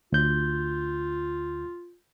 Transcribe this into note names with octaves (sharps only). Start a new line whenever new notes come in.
D2 F4 G6